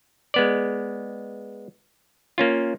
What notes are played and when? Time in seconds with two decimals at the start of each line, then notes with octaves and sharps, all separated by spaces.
0.34 G#3 B3 D5
2.38 A#3 C#4 F4